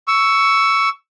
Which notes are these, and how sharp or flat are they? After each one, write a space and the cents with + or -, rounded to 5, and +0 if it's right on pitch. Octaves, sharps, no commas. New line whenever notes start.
C#6 +15 E6 +0